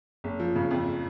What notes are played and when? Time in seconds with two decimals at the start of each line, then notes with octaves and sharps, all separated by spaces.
0.24 F#1
0.40 F3
0.55 C#3
0.71 F2